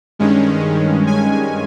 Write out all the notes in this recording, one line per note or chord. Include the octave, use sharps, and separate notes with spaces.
G2 D#3 G#3 C#4
G#5